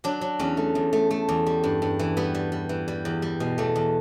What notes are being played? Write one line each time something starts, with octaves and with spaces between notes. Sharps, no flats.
F#3 D4
F#3
E2 C#4
A3
E2
A3
A3
E2
G3
G2
G2
E3
G3 B3
G3
G3
E3
G3
E2
G3
B2
E2 A3
E2